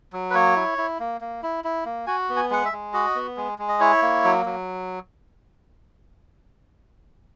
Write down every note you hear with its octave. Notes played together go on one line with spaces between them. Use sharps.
F#3
B4
A#3 C#5
E4
E4
A#3
A#3
E4
E4
A#3
F#4 G#5
B3
G#5
G#3 F#5
E5
G#3
F#4 D#5
B3
G#3
G#3
D#5
E4 C#5
A#3
F#3
F#3